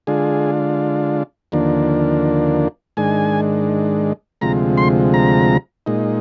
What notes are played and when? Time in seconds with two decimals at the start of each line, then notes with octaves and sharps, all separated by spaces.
0.07 D3 G#3 D4 F4 G#4
1.52 D#2 D3 F3 A#3 D4
2.97 G#2 D#3 G#3 D4 G#5
4.41 D2 C3 F3 G#3 A#5
4.78 C6
5.14 A#5
5.86 A#2 G#3 D#4